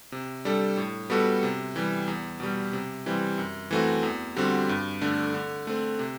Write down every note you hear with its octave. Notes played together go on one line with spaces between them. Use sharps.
C3
G3 D4 A4
A2
G3 B3 F#4 A4
C3
E3 G3
E2
B2 G3
C3
E3 G3 C4
F#2
E3 A3 C4 F#4
E2
D3 G3 C4 F#4
G2
D3 A3 D4
D3
A3 C4
C3